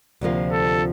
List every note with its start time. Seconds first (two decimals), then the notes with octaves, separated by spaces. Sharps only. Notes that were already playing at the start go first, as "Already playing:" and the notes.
0.21 D2 C3 F3 A#3 F4
0.52 A4